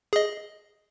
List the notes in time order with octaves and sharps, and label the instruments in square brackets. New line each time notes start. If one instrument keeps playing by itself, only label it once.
[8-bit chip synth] G#4 D#5